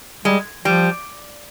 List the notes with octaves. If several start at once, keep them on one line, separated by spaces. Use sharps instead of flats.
G3 G#3
F3 G3